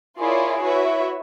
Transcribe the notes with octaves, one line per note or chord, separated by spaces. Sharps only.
E4 F4 G#4 A#4 C#5 D5
E4 F#4 B4 C#5 E5